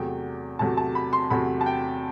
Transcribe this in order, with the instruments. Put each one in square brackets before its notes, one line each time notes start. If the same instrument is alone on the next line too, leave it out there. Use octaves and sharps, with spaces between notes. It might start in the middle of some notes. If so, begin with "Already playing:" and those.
Already playing: [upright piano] E2 C3 F#3 A3 G5
E2 C3 F#3 A3 A5
A5
B5
C6
E2 C3 F#3 A3 B5
A5
G5